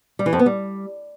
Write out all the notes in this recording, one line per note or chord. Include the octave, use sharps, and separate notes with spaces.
G3
E3
F2
B3
G3